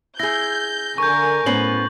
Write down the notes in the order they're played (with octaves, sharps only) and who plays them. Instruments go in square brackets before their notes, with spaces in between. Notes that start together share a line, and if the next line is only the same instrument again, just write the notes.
[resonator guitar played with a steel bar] E4 G#4 [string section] G6 [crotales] A#6
[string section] D3 A#4 G#5 [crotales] C#6 G6
[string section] A2 [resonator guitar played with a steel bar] B3 C#4 C5 [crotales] F#7